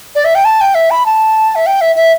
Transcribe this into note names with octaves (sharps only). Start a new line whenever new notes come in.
D5
E5
G5
A5
G5
E5
B5
A5
E5
G5
E5
E5